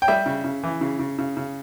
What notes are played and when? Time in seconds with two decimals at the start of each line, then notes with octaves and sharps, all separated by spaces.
0.02 G5
0.08 G3 E5
0.26 C#3
0.44 C#3
0.63 E3
0.81 C#3
0.99 C#3
1.19 C#3
1.37 C#3